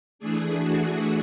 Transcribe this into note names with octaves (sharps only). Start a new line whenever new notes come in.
E3 A3 D4 G#4
F#4